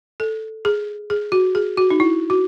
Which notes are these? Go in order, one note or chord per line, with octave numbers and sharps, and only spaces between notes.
A4
G#4
G#4
F#4
G#4
F#4
D#4
E4
F#4